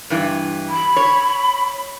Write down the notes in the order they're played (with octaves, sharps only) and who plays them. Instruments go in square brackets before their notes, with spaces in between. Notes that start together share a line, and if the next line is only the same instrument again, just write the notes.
[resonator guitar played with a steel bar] G2 E3
[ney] B5
[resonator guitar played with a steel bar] C#5